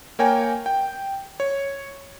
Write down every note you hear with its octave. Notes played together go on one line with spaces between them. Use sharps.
A#3 A#4 C#5 G5 G#5
G5
C#5